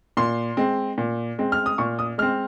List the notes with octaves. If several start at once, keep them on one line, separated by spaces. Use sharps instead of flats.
A#2 C6
G#3 C4
A#2
G#3 C4
F6
D#6
A#2 C#6
D#6
G#3 C4 F6